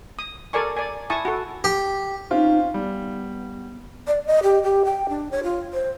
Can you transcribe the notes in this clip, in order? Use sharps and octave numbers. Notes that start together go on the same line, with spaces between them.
D#6
A4 A#4 D5 G#5 C#6
D5 G#5
E4 G#5 A5 C#6 D#6
F#4 A4
G4
C4 C#4 D#4 F4
G3 B3
D5
D#5
G4
G4
G5
D4
C#5
F4
C5